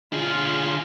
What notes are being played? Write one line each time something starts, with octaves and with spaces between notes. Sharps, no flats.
D3 F4 G#4